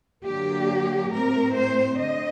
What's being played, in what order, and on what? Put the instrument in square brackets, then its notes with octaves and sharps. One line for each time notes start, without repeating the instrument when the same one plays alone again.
[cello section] D3 F#3 A#3 G4
A2 A3 C4 A#4
C5
D3 D#5